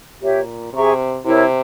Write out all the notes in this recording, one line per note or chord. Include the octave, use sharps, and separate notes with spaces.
A#2 G4 C#5 E5
C3 G#4 E5 A#5 C#6
C3 E4 A#4 C#5